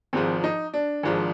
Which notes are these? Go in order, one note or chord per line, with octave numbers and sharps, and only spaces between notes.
G#1 G#2 F3 C4
D#4
D4
G#1 G#2 F3